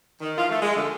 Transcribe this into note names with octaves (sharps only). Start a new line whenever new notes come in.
D#3
E3 F3 F4
A3
G#3
D3 F3 A3 A#3